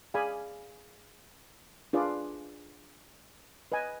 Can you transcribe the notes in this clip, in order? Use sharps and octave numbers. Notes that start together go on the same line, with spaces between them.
G#4 D5 F5 G#5 B5
D4 F4 G#4 B4 D5
B4 D#5 G#5